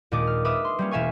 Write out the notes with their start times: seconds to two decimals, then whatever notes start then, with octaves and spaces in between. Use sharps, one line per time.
0.12 D#2 A#2 G#3 D4 D#5 D6
0.27 F6
0.45 B4 E5 D6 D#6 F6
0.65 C6
0.79 G3 A#3 C#4
0.91 E1 E5 F5 G#5 C#6